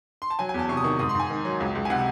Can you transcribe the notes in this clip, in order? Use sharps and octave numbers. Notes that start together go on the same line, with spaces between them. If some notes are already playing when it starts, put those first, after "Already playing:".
C6
A5
F#3 G#5
G#5
E2
A5
C3 C#6
D#6
D#3 C#6
G#2 D#6
C6
G#2 G#5
D#3
F#3
C#2
C#2
G#5
C3 F#5